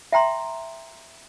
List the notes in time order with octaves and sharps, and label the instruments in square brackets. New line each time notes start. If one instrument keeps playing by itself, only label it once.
[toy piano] E5 G5 A#5 C6